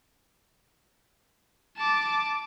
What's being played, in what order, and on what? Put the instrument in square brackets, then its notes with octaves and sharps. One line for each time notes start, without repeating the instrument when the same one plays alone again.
[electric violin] A5 D6